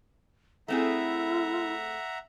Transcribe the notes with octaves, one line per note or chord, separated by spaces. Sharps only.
A3 C4 E4 G#4 E5 F#5 A#5